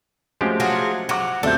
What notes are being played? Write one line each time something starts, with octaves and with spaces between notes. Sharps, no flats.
F3 G#3 A3 C#4 F#4 G4
F#3 F4 G#4
F#3 D6 C#7
D#1 F#3 A3 C4 D4 A4 E5 G6